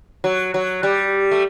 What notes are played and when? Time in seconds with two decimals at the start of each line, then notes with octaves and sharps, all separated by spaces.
0.24 F#3
0.54 F#3
0.83 G3
1.31 A3